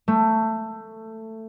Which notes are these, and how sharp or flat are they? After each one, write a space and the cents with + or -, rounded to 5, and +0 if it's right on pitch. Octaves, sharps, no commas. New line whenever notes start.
A3 +15